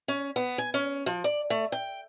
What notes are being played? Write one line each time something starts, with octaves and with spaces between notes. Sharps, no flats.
C#4
B3
G#5
C#4
F3
D5
A3
G5